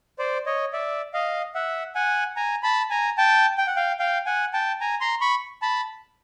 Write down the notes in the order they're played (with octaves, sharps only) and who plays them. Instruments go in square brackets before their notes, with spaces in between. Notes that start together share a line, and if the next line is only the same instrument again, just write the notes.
[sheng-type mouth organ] C5 D5
C#5 D#5
D5 E5
D#5 F5
E5 F#5
F#5 G#5
G#5 A#5
A5 B5
G#5 A#5
G5 A5
G5
F#5
F5 G5
F5 G5
F#5 G#5
G5 A5
G#5 A#5
A#5 C6
B5 C#6
A5 B5